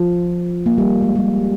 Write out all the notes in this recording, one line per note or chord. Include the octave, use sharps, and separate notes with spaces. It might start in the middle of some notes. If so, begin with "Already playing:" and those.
Already playing: F3
A#3
G3
G#3
G3